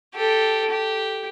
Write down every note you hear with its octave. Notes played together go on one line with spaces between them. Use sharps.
G4 A4
G4